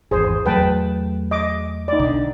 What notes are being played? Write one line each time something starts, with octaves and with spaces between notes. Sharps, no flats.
G#1 E2 G#4 C5
E2 F#3 A3 B4 G5 A5
D#5 D6
D#4 D5
B1 D3